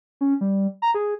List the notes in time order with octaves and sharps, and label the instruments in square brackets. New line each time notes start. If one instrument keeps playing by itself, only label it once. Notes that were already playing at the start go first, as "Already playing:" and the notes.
[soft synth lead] C#4
G3
A#5
G#4